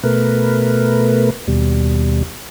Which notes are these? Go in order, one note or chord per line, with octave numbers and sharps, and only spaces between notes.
B2 A3 A#4 B4
D#2 B2 G3